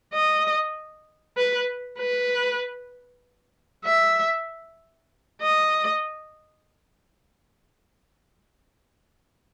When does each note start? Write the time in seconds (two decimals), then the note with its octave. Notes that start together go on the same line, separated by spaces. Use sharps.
0.14 D#5
1.38 B4
1.99 B4
3.86 E5
5.41 D#5